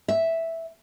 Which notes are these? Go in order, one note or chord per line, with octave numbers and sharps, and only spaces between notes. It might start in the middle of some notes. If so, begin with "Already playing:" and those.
E5